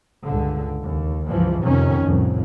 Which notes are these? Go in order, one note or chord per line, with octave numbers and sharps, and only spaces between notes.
C#2 G2 D3
D#2
C#2 G2 E3 F3
F2 C3 D#3 C#4
C2 F2 A2